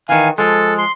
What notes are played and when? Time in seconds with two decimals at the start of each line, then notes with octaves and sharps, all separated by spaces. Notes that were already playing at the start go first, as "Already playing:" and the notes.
0.09 D#3 E3 F5 G#5
0.38 F3 G#3 A4
0.78 C6